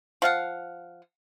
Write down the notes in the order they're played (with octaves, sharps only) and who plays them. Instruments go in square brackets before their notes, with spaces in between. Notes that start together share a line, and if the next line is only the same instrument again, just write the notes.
[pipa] F3 F5 F#5